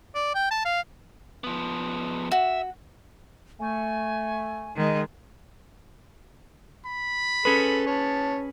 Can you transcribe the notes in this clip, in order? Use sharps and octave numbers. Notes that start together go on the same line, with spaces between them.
D5
G5
A5
F5
F3 B3
F#4 E5
A3 G#5
D#3 G#3
B5
C#4 G#4 A4 B4
C#5 A5